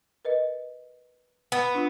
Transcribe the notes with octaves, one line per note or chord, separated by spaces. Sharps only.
A#4 B4 D#5
B3
D4 F4